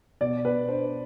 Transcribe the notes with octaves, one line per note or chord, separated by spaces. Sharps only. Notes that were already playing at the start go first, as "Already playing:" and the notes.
B2 D5
B2 B4
D4 C5